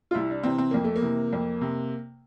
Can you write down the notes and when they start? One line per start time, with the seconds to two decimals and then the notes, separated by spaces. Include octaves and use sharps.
0.11 F4
0.14 C2 E4
0.30 D4
0.43 C3 E3 C4
0.58 C4
0.71 F2 A#3
0.84 A3
0.96 A#3
1.02 C3 E3
1.33 F2
1.61 C3